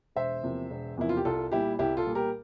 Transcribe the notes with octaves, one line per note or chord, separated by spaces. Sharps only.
E1 C5 E5
E2 C3 F3 A#3
E1
E2 C3 F3 A#3 E4
F4
G4
C2 F4 A4
A#2 G3 A#3 E4 G4
C2 E4 G4
F4 A4
A#2 G3 A#3
G4 A#4